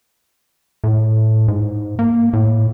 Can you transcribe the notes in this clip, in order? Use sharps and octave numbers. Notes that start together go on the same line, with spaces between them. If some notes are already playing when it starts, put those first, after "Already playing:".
A2
G#2
A#3
A2